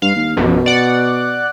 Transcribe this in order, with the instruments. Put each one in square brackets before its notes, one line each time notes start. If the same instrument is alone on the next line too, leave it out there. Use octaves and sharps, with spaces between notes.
[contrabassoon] G2 [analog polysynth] F5
[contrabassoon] D#2
[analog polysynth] A#1 F#2 [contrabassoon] B2
[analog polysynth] D5 F#5